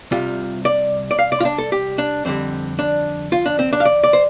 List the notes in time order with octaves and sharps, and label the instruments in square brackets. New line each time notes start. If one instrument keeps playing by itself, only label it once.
[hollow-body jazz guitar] C2 C3 G3 F4
D5
D5
F5
D5
F4
D4
A4
G4
D4
F2 D3 G3 C4
D4
F4
D4
C4
D4
F5
D5
D5
C5